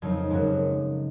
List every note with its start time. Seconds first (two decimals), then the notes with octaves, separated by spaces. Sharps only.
0.02 F2 C#3 F#3 C4 D#4
0.30 F#2 C#3 G#3 D#4 F#4